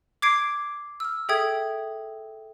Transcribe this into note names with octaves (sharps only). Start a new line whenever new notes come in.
D6 G#6 C7 D7
E6 F6
G#4 A4 E5 G5 D#6 G#6